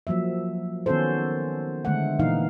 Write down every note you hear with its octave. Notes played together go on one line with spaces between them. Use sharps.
F3 F#3 A#3 E5
D#3 B3 C#4 F#4 A4 C5
D3 D#3 G#3 A3 F#5
A#2 E3 D#4 F5